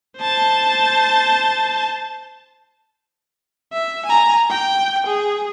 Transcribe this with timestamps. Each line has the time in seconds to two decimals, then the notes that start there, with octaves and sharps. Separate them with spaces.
0.19 C5 A5
3.73 E5
4.05 G#5 A#5
4.50 G5
5.07 G#4